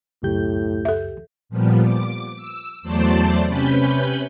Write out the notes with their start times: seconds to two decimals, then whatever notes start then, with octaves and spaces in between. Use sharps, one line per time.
0.23 C#2 F#2 A2 G4 G6
0.85 A4 E5
1.49 A#2 F3 G3 B3
1.84 D6
2.35 E6
2.82 E2 F#3 A3 C5 D5 A5
3.45 C3 C#4 B4 B5 G6